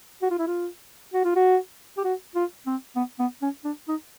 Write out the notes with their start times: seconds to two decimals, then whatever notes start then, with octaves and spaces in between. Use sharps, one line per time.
0.22 F#4
0.31 F4
0.39 E4
0.47 F4
1.14 F#4
1.25 F4
1.36 F#4
1.98 G4
2.04 F#4
2.35 F4
2.66 C4
2.96 B3
3.19 B3
3.42 C#4
3.64 D4
3.88 D#4